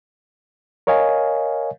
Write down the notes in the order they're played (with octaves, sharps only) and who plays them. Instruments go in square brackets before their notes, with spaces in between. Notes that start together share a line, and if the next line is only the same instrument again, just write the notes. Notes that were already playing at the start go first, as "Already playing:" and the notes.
[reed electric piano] A#4 C#5 D#5 F5 G#5